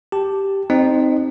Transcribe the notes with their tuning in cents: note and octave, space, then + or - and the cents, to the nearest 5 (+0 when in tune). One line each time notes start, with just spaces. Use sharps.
G4 +0 A5 +0
C4 +0 D#4 +0 D#5 -35